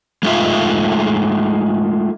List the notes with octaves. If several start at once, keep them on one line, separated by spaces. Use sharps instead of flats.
G#3 A3 D#4 F4 E5